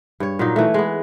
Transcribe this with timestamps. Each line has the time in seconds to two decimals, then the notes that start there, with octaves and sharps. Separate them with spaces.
0.20 G2 C#5
0.39 A#2 F#3 D#4
0.56 E3 A3
0.74 G#3 B3